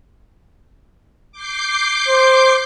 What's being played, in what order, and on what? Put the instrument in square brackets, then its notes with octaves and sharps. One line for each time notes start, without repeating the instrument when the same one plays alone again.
[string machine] D6 G6 C7
[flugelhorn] C5